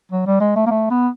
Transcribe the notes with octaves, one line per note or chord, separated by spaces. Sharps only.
F#3
G3
G#3
A3
A#3
A3
B3